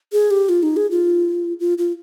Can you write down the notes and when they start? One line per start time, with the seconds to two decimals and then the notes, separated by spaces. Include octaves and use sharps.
0.12 G#4
0.31 G4
0.49 F4
0.63 D#4
0.77 G#4
0.91 F4
1.60 F4
1.78 F4